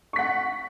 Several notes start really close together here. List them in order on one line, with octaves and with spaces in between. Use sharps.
C#6 B6 F#5